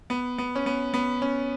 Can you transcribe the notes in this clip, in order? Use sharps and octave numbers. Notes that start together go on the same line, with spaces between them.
B3
B3
C#4
B3
B3
C#4